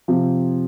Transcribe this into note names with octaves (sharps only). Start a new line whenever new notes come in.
C3 F3